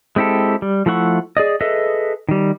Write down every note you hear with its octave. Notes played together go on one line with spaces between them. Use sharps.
G#3 C4 E4 G4 A4
G3
F3 A3 E4 F#5 C#6
G#4 D5 D#5
G#4 A4 B4 D#5 E5
D#3 G3